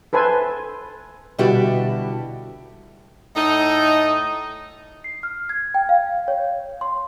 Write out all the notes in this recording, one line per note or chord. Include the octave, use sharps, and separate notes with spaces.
A4 B4 C5 G#5
B2 D3 G3 E4 F#4 G4
A2 D#4
C7
F6
G#6
G5
F5
C#5
C6